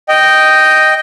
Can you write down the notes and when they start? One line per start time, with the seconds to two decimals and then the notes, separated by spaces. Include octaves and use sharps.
0.09 D#5 G5